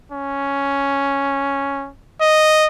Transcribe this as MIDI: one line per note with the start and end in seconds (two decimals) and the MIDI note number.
0.12 1.90 61
2.21 2.67 75